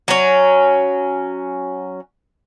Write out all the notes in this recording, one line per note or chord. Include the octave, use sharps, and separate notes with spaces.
F#3 C#4